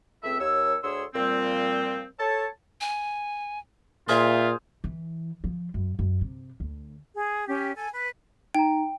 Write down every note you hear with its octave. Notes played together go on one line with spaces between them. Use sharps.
C#2 A3 C4 E5
D#2 C#5 E6
D2 D3 G#4 C#5 C6 E6
A#2 F3 G3 C4
A4 C#5 A5
G#5
A#2 F4 G#4 C5 E5 F5
E3
F3
F#2
F#2
C3
D2
G#4
C#4 G4
A4 G#5
B4
D#4 G5 A#5